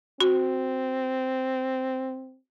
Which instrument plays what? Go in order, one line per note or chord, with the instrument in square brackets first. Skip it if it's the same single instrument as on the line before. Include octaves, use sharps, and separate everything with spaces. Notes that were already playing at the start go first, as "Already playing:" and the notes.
[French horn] C4 [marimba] F#4